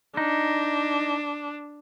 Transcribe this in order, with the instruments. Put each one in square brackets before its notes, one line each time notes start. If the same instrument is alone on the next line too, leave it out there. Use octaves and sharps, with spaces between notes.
[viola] D4 [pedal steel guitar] D#4